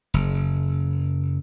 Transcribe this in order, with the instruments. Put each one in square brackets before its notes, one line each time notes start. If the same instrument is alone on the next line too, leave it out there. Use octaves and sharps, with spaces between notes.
[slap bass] F#1